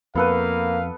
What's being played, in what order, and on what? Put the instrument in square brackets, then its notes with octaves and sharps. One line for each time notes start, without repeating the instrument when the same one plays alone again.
[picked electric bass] F2 [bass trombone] A#3 [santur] B3 A4 B4 [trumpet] F5